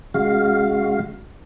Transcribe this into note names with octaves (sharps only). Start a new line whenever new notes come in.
C#3 G#3 F#4 F5